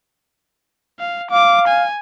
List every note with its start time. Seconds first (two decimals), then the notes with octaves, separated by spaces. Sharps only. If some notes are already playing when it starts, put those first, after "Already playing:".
0.99 F5
1.31 F5 D6
1.68 G#5